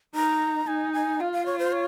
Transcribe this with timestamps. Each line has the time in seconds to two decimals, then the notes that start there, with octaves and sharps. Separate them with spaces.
0.15 D#4 A#5
0.67 D#4 G#5
0.93 G#5
1.20 F4 F5
1.33 F5
1.46 C#5
1.59 C5
1.72 C#5